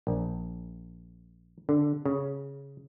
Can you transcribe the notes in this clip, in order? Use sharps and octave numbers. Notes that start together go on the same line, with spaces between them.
A#1
D3
C#3